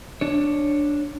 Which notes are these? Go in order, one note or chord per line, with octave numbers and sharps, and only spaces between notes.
D4 C#5